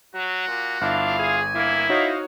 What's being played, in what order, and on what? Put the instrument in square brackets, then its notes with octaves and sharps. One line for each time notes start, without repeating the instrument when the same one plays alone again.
[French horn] F#3 [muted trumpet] F#4
[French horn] A#2
[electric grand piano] G1 [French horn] D4 [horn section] E4 F4 F5
[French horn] G#4 [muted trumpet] G#5
[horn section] A#3 [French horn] E4
[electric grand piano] D#4 F#4 C#5 [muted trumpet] C5 [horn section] D#5 F5